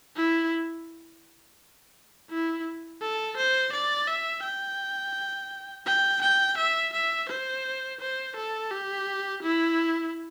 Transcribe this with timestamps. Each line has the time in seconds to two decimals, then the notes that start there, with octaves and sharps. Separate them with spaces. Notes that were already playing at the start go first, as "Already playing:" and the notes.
0.16 E4
2.30 E4
3.01 A4
3.37 C5
3.72 D5
4.07 E5
4.43 G5
5.86 G5
6.22 G5
6.57 E5
6.93 E5
7.29 C5
8.00 C5
8.36 A4
8.71 G4
9.43 E4